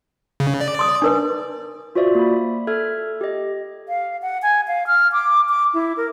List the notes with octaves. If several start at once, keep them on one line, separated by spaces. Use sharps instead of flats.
C#3
D5
C6 D#6
D4 A#4 B4
F4 F#4 C5 D5 E5
A#3 B5
A4 E5 F6 G#6
G4 D#5
F5
F#5
G#5
F5
F6
D6
D6
E4
A#4